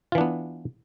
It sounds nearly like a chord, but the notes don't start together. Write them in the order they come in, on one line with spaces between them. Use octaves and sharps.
F4 E3 D4 B3